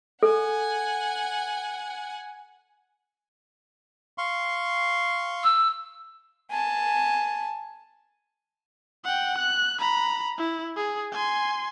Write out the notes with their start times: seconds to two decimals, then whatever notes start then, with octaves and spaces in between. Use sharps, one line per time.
0.23 A4 F#5 G#5
4.18 F5 C6 C#6
5.44 E6
6.51 G#5 A5
9.04 F#5 G5
9.38 F#6
9.79 A#5 B5
10.38 E4
10.77 G#4
11.12 G#5 C6